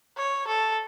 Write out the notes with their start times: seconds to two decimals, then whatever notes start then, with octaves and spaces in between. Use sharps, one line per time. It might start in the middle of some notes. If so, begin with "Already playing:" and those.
0.17 C#5
0.47 A4